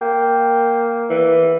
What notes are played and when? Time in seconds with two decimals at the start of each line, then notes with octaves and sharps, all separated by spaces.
0.01 A#3 G5
1.10 E3